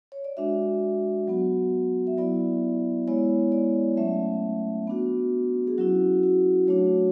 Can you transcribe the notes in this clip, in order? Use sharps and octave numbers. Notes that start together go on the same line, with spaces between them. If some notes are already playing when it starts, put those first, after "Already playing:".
C#5
D5
G#3 D4 F#4 E5
F#3 B3 F#4
E5
F#3 B3 E4 D5
G#3 B3 E4 C#5
D5
F#3 A3 C#4 E5
B3 D4 F#4
G#4
F#3 C#4 E4 F#4
F#4
F#3 A3 D4 F#4 C#5